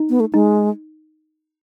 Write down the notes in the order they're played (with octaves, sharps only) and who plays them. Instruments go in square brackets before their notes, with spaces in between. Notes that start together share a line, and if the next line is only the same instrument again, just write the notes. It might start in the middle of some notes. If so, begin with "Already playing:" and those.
Already playing: [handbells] D#4
[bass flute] B3
A3
[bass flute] G#3 [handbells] D#4